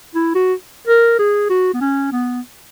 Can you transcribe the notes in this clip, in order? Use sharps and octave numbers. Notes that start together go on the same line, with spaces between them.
E4
F#4
A#4
G#4
F#4
B3
C#4
B3